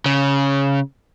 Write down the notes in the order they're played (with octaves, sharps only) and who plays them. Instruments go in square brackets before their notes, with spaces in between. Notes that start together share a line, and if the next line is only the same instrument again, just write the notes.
[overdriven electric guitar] C#3